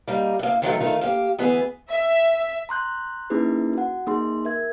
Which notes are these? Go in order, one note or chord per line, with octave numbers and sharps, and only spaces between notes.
G3 A#3 D#4
A2 A#3
D#3 F3 F#3 A3
D#3 A3 F4
A#3 G4
D2 E3 B3 G#4
E5
A#5 C6 F#6 G6
A#3 C#4 D#4 E4 G#4 B4
F#4 F#5
A#3 D#4 G#4 C6
A#4 E5 G#6